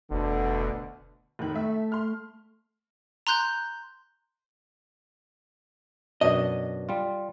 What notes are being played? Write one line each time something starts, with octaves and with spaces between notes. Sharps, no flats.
F1 D2 B2 D3
F1 A2 D#3
A3 E5
C6 F6
A#5 C6 F#6 G6
F#2 B2 D4 D#5
G3 F4